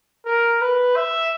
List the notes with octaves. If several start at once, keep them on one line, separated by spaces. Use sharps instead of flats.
A#4
B4
E5